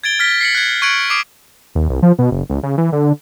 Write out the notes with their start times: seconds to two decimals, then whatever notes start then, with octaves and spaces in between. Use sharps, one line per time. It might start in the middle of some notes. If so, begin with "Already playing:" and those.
0.04 G#6 A6 D7 G7
0.20 F6 A6 B6
0.41 C7 C#7 F#7
0.55 F#6 G#6
0.82 C#6 F#6 G#6 C#7 D7 F#7
1.10 D6 D#6 C7 D7
1.75 D#2
1.89 C2
2.02 F3
2.19 B2
2.31 F#1
2.50 C#2
2.63 C#3
2.78 E3
2.92 D3